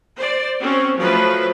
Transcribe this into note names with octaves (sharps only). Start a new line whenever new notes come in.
C5 D5
C4 C#4 F#4
F3 F#3 A3 B4